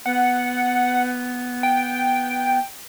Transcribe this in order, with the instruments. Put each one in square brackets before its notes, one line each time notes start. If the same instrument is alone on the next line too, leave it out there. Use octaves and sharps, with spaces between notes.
[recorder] B3 [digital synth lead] F#5
[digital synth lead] G5